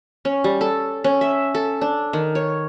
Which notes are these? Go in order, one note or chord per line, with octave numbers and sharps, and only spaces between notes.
C#4
G3
A4
C#4
E5
A4
D4
D#3
C#5